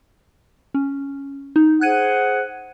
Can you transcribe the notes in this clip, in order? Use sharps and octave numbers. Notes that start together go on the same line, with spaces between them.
C#4
D#4
G#4 C5 F#5 F#6 G#6 D#7